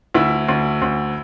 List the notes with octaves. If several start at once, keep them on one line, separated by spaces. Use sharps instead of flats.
D2 E4
D2
D2